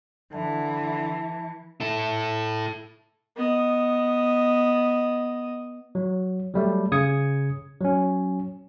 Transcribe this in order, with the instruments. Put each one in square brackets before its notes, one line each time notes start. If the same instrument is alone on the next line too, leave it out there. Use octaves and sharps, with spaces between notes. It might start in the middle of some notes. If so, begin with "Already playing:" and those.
[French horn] D3 [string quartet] E3 [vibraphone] E5 A5
[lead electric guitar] E4 A4
[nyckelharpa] B3 D#5
[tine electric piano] F#3
F#3 G3 A3
C#3 D#6 G#6 C#7
F#3 C#4